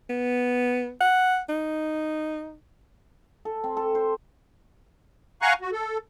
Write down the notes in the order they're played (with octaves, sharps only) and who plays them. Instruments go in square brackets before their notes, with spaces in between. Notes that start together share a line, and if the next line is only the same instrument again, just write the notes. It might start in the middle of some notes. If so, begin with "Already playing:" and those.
[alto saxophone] B3
F#5
D#4
[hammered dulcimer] A4
C4
A4
C5
[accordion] F5 F#5 G#5 A#5 C#6 F#6
F#4
A4